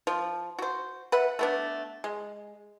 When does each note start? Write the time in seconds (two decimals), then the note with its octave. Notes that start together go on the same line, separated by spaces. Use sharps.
0.07 F3
0.59 F#4 C5
1.12 B4 E5 F#5
1.39 A3 B3 D4
2.04 G#3